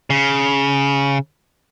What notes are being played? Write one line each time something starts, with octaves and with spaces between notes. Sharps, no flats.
C#3